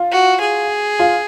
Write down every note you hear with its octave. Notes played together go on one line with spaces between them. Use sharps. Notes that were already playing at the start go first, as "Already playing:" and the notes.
Already playing: F4
F#4
G#4
F4